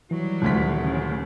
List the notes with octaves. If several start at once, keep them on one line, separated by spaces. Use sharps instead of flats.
E3 F#3 G3
D#1 D2 B6
C#3